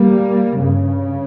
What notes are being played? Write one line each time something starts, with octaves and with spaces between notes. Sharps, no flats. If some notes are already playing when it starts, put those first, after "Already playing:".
Already playing: G3 A#3
G2 C#3